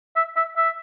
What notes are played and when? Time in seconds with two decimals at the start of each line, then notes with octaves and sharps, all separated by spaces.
0.16 E5
0.36 E5
0.57 E5